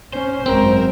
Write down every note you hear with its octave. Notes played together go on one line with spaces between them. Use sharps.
C#4 C5
G#1 F#2 C4 A#4